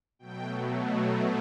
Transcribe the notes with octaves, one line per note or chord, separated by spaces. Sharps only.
B2 F#3 A3 G5